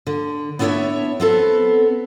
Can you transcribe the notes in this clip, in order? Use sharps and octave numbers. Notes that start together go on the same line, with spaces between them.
D3
B3 D4 E4 C5 C#5 E5
B3 C4 A4